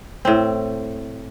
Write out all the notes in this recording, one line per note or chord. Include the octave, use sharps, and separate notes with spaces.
A2 C4